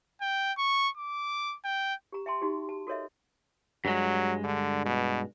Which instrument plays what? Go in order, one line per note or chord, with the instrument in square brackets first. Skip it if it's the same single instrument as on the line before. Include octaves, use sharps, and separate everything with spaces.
[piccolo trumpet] G5
C#6
D6
G5
[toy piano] G4 A#5
E5 G5 A5 C6
D#4 F#4 G4
A5
F#4 A4 A#4 C#5 D#5 E5
[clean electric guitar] G2 G#3 [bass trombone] F#3
[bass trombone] D3
B2